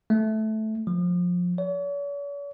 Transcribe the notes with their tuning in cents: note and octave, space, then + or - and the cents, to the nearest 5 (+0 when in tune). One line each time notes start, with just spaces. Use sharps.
A3 -10
F3 +25
C#5 +45